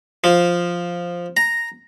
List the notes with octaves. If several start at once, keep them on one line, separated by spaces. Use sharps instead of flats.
F3
A#5